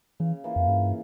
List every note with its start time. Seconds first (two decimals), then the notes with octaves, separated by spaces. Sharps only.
0.20 C#3 E3
0.44 E3 A#3 F4
0.56 F2
0.68 G2 C#3